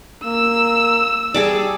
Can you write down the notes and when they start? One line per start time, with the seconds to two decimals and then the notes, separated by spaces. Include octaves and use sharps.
0.24 A#3 E6
1.34 G3 G#4 A4 D5